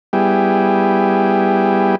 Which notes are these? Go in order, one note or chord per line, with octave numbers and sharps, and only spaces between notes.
G3 B3 E4 G4 G#4